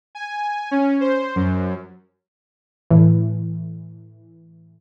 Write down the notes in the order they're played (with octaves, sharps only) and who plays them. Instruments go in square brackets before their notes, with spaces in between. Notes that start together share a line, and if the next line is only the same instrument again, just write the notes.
[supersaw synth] G#5
C#4
C5
F#2
[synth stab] A2 E3